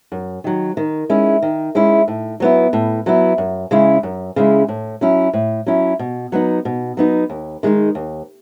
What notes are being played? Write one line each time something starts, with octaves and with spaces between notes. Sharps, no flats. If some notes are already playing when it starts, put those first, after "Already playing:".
F#2
D#3 F#3
D#3
G#3 C#4 E4
D#3
G#3 C#4 E4
A2
F#3 B3 E4
A2
F#3 B3 E4
F#2
C#3 G#3 C#4 E4
F#2
C#3 G#3 C#4 E4
A2
F#3 C#4 E4
A2
F#3 C#4 E4
B2
F#3 B3 D#4
B2
F#3 B3 D#4
D#2
D#3 G#3 D#4
D#2